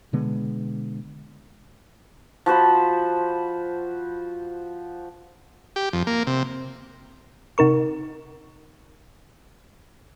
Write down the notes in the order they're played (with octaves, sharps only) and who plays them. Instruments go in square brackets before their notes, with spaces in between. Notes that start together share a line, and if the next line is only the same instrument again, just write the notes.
[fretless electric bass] B2 D3 G#3 B3
[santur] F3 F#4 C5 B5
[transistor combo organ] G4
F2
A#3
C3
[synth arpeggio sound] C3 D#4 A#4 C#6